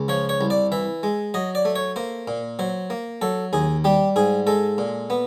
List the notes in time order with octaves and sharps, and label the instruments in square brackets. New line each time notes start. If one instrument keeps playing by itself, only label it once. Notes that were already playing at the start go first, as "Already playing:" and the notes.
Already playing: [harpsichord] C#2
F3 C#5
C#5
C2
D5
E3 E5
G#3
F#3 D#5
D5
A3
C#5
A#3 C5
A#2
F#3 C5
A#3
F#3 A4
D#2 G#4
G3 G4
G#2 G#4
G#3 A4
A#2
B3